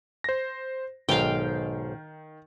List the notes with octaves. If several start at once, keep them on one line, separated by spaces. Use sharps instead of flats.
C5 A#6
B1 G#2 D#3 F5 G5